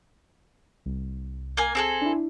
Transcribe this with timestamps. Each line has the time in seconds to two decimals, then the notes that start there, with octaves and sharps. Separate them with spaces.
0.86 C2
1.57 A#3 G#5
1.75 C4 G#4 A4
2.01 D4 E4